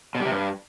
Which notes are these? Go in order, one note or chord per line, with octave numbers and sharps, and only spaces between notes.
B2
G3
C3
G2